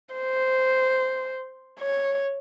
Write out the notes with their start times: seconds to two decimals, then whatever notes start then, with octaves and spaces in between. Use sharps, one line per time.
0.15 C5
1.80 C#5